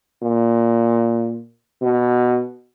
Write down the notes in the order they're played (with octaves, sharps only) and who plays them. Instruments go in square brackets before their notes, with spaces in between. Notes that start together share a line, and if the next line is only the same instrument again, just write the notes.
[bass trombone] A#2
B2